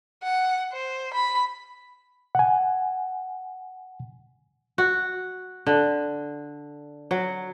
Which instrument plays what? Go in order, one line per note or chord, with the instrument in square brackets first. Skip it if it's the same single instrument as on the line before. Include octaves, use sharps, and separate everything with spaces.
[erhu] F#5
C5
B5
[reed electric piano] F#5 G#5
[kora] F#4
D3
F#3